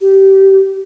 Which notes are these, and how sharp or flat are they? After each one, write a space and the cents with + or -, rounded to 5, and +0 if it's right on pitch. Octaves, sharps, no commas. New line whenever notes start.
G4 -20